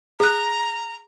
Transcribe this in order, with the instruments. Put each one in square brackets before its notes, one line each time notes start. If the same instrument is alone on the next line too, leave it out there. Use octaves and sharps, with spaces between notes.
[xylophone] G#4 F#6 [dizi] A#5